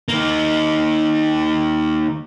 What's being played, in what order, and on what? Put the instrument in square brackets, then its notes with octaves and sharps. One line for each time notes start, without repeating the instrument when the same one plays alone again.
[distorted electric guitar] D#3 A#3